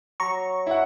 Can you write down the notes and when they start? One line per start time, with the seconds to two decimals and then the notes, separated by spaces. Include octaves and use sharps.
0.20 F#3 A#5 C#6
0.67 E4 F#5